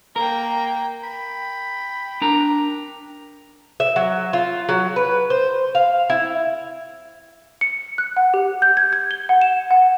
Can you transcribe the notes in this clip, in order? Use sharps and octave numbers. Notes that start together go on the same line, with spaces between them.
A#3 A#4 G5 A#5
G5 B5
D4 A#4 A#5
E5
F#3
F4
F#3
B4
C5
F5
E4
C#7
F#6
F#5
G4
G6
G#6
G#6
G7
F#5
E7
F#5